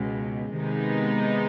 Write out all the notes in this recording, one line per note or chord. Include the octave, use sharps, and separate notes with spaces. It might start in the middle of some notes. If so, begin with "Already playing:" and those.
Already playing: C#2 B2 G#3
C3 D#3 G#3 B3 D#4